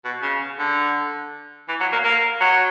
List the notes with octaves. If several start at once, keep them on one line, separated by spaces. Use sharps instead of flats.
B2
C#3
D3
E3
F#3
A#3
A#3
F#3